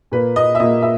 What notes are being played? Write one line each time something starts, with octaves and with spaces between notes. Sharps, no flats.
A#2 A#3 B4
D#5
E5
A#2 A#3 D#5
E5